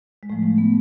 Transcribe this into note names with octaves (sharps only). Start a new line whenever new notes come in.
G#3
A2 F3 A3
A3
B3